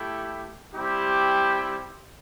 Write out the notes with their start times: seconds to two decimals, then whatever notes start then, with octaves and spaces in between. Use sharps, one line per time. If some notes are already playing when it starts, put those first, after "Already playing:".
Already playing: A3 E4 G4
0.73 G3 C4 E4 G4